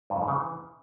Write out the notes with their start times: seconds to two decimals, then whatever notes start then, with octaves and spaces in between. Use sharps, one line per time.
0.10 G2
0.16 F2
0.22 G#2
0.28 C#3
0.34 E3